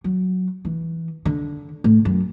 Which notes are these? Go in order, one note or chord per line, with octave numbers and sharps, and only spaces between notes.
F#3
E3
D3
A2
F#2